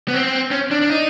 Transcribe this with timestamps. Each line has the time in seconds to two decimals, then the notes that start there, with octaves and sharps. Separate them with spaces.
0.08 B3
0.14 C4
0.51 C#4
0.71 D4
0.81 D4
0.90 D#4